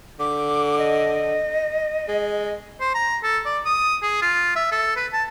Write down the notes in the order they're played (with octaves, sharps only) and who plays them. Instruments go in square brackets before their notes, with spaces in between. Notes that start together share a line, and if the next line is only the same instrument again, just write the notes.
[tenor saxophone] D3 [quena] D6
[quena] D#5
[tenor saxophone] G#3
[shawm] C5
A#5
A4
D5
D#6
G#4
F4
E5
A4
B4
A5